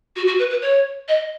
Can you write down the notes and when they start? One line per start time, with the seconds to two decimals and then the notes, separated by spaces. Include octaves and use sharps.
0.16 F#4
0.27 F#4
0.39 B4
0.50 B4
0.62 C#5
1.08 D#5